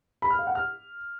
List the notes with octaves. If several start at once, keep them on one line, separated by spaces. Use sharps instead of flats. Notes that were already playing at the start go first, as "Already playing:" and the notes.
B5
F6
F5
F#5
F6